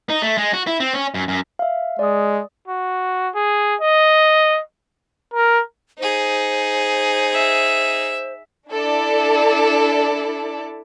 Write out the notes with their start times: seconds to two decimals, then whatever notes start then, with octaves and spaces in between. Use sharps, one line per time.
0.10 D#4
0.22 A3
0.38 G#3
0.54 F#4
0.67 E4
0.80 C4
0.94 C#4
1.14 F#2
1.28 F#2
1.59 E5 F5
1.99 G#3 D5 D#6
2.68 F#4
3.35 G#4
3.80 D#5
5.34 A#4
5.99 D#4 G#4 C5
7.33 E5
8.70 D4 E4 A4 D5